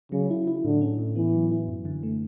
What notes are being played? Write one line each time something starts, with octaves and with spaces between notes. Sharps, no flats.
C#3 F#3
E4
E4
A2 D3
C#4
A2
E3 B3
F#3
E4
F#2
D3
A3